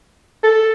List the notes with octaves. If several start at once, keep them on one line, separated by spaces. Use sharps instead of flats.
A4